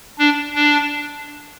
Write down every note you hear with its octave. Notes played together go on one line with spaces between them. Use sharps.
D4
D4